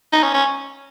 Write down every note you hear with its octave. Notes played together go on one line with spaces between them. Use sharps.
D#4
C#4
C#4